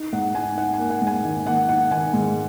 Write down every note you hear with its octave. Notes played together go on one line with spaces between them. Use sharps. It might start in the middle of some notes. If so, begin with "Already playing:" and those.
Already playing: D#4
G#2 F#5
D#4 G#5
D#4 F#5
G#5
A#3
F#5
G#2
G#5
D#3
A#3 F#5
D#4 F#5
D#3 G#5
G#2